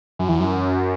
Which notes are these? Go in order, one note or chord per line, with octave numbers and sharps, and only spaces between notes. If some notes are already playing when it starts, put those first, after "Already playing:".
F#2
E2
F#2